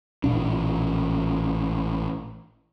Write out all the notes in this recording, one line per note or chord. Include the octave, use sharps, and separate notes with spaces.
A1 A#2 D4